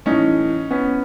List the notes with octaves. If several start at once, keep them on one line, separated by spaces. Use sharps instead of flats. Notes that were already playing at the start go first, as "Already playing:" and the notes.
A2 E3 C#4 D#4
B3 C#4